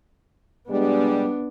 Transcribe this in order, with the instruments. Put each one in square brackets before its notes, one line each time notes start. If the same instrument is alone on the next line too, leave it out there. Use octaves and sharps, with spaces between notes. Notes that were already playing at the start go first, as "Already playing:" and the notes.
[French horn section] G3 G#3 [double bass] B3 D4